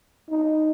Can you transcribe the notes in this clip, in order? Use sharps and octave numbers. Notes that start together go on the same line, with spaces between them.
D#4